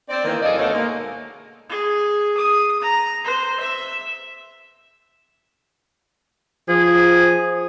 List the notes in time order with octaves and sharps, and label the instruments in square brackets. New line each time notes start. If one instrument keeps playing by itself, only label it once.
[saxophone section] C4 D5
D#3 E3 A#3
F#2 G#4 A4 D5 D#5 F5
D2 B2 A3 D#4 C#5 F5
G#3 A#3
[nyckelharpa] G#4
D#6
A#5
C5
E5
[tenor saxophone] F3 [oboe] G#4